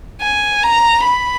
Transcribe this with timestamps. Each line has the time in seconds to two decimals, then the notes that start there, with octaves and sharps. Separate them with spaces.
0.21 G#5
0.63 A#5
1.04 B5